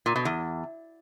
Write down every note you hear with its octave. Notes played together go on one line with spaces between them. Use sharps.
A#2
B2
E2